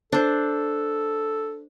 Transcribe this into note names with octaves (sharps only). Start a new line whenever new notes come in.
D4 A4 C5